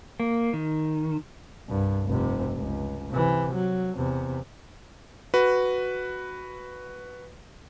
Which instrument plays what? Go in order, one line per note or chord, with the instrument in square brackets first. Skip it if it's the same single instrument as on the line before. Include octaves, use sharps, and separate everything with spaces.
[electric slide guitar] A#3
D#3
[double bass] C2 G2
F1 C3
C#2
C3 E3
F#3
E2 C3
[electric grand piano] F#4 B4